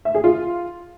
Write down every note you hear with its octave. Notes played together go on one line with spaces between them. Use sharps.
E5
G#4
F4